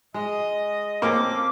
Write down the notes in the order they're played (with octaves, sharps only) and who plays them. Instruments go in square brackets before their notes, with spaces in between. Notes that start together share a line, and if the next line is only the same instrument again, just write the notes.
[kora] G#3 [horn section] D#5
[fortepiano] A#3 [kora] C4 C#4 A4 [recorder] D6